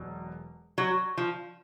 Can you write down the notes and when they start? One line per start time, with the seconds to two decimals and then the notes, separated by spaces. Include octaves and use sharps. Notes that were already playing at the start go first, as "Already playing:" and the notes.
Already playing: E1 E2 B2 F#3
0.78 F#3
1.17 F3